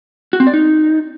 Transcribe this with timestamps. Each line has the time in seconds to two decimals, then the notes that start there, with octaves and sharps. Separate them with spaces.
0.33 F#4
0.40 C4
0.47 D5
0.54 D#4